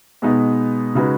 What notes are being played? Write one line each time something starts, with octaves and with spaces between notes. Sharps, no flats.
B2 G#3 B3 D#4 B4
C#3 G#3 D#4 F#4 B4